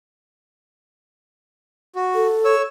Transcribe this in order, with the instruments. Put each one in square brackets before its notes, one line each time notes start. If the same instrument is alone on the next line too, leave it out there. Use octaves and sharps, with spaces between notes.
[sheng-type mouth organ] F#4
[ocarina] A4
[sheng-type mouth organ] C#5 E6